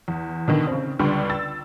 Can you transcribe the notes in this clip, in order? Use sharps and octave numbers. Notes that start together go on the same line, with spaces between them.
E2
B2 D3 D#3
C#3 C4
C#2 D3 G3 D5 C6 C#6
E6 A6